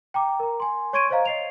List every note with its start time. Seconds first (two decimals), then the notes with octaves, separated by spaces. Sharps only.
0.14 G5 A#5 D6
0.40 A#4 A#5
0.60 G#5 C6
0.93 C#5 C6 C#6 G#6 D7 D#7
1.10 C5 C#5 D#5 F5 A#5
1.25 D#5 C7 F7